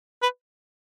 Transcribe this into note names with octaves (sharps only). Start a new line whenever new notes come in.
B4